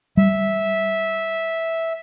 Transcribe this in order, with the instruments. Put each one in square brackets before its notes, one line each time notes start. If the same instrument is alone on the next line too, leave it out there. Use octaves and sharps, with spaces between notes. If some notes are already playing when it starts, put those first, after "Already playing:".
[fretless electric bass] G3 [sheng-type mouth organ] E5